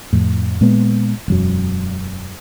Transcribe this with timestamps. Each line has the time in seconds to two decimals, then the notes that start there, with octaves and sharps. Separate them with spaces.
0.13 F2 A2
0.61 A#2 G#3 B3
1.28 E1 F#2 F#3